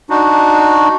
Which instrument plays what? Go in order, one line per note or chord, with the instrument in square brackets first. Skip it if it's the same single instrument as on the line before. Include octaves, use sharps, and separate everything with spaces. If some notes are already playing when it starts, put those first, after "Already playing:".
[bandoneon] D4 D#4 F#4